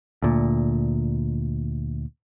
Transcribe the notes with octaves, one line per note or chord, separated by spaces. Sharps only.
D2 A#2